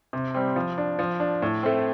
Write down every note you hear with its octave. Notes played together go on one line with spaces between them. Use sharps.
C3
G3 C4
F3
D4
F3
D4
A2
A3 C4